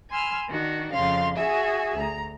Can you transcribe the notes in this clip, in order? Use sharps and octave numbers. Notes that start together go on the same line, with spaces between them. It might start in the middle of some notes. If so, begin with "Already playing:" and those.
G#5 B5 C6 E6 F6
D#3 D4 F#4
F2 C#3 F5 C6
F#4 G#4 E5 G#5
D2 A#5